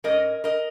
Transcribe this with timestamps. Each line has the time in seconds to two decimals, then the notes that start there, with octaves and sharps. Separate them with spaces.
0.04 G#2 G#3 C#4 A#4 D#5
0.44 A#4 D#5